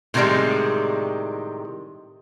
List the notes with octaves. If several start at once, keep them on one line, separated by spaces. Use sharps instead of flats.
A2 C3 D#3 E3 G3 G#3